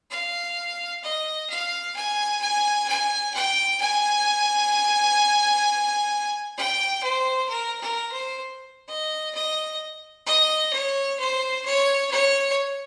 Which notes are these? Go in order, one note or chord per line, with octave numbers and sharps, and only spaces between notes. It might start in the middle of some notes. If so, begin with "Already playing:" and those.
F5
D#5
F5
G#5
G#5
G#5
G5
G#5
G5
C5
A#4
A#4
C5
D#5
D#5
D#5
C#5
C5
C#5
C#5